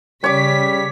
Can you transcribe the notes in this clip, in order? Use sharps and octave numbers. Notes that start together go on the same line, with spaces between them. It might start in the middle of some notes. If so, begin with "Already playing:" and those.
C#3 G3 C#5 D6 B6